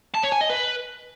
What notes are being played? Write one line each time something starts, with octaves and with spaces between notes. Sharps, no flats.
A5
C#5
G#5
D#5
B4